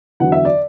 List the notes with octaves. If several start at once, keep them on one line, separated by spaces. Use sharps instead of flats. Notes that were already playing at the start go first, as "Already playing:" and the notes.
E2 D3 F#3 F#5
E5
D5